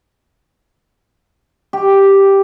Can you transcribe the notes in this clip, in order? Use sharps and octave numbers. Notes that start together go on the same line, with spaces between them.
G4